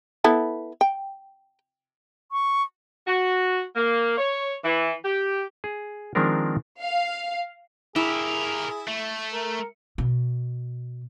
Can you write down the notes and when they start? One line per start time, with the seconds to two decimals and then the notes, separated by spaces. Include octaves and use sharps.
0.24 B3 E4 A4
0.81 G5
2.32 C#6
3.07 F#4
3.75 A#3
4.18 C#5
4.64 E3
5.05 G4
5.64 G#4
6.15 D#3 F3 G#3 C4 D4 A#4
6.80 F5
7.96 E4 G4 G#4 A#4
8.87 A3
9.33 A#4
9.98 B2